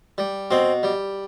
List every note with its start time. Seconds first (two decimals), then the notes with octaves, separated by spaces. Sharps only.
0.18 G3
0.51 B2 C4
0.83 G3